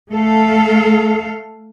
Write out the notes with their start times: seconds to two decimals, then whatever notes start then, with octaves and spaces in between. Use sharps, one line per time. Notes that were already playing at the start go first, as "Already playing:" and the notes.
0.11 A3 A4 F5